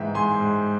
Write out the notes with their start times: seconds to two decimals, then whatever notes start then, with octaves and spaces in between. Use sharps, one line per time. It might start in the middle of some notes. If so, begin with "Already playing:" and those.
Already playing: G#2 E3 E5 G5
0.14 G#2 G#5 C6
0.40 G#2